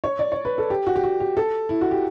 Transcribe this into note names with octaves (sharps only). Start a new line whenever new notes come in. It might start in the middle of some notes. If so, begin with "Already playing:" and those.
C#5
D5
C#5
B4
A4
G4
F#4
G4
F#4
G4
A4
E4
F#4
G4